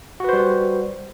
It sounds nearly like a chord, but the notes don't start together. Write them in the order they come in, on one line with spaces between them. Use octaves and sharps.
F#4 B4 C5 G3